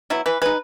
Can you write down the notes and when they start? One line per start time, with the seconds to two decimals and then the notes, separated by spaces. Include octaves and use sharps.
0.10 F#3 B3 E4
0.26 E3 B4
0.42 G#3 D#4 B4